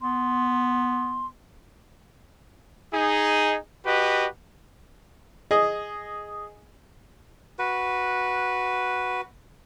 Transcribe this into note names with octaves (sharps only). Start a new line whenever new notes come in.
B3 C6
D#4 G#4
F#4 G4 B4 D#5
G#4 D#5
F#4 B4